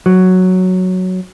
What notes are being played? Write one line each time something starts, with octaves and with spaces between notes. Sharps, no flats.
F#3